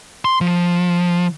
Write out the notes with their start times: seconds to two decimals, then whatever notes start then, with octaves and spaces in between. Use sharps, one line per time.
0.25 C6
0.41 F3